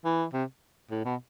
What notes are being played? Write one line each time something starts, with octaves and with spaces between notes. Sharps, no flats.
E3
C3
A2
B2